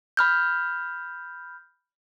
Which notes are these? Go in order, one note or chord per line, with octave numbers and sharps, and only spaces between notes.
B5 F6 G6